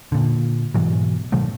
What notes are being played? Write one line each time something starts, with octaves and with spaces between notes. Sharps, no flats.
A#2 D3
G#2 B2 E3 F#3
B2 D#3 F#3 A3